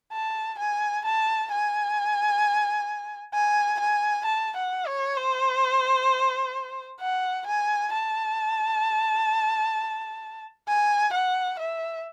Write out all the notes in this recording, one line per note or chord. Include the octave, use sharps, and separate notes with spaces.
A5
G#5
A5
G#5
G#5
G#5
A5
F#5
C#5
C5
F#5
G#5
A5
G#5
F#5
E5